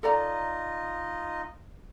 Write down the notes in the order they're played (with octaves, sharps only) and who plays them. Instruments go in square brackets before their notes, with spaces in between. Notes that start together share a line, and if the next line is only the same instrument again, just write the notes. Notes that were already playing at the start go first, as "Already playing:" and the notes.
[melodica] D#4 F4 D#5 [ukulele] A4 D5 A#5